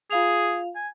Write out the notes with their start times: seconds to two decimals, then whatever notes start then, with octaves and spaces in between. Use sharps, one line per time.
0.11 F4 G#4 F5 F7
0.76 G#5